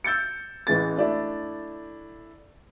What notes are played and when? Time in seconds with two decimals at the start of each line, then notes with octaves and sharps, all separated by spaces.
0.04 E6 G6 A6 C#7
0.67 A1 E3 G#3 A6
0.97 A3 D4 E4